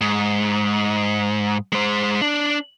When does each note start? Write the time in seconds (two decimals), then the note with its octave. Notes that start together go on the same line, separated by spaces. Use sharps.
0.01 G#2
1.72 G#3 C5
2.22 D4